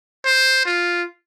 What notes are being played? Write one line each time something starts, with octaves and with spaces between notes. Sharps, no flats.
C5
F4